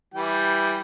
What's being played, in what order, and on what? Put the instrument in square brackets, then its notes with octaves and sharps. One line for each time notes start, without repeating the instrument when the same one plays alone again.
[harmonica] E3 G3 G5